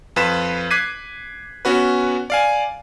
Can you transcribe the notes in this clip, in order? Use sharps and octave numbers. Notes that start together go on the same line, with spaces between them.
F2 F4 B4 B6 E7
D6 F#6 G#6 B6 C7 D#7
B3 C#4 F#4 B4
D5 F5 G#5